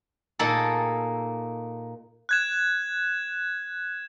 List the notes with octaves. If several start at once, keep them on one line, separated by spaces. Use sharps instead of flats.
A#2 A#3 D#4 G#4 A4
F#6 G#6 E7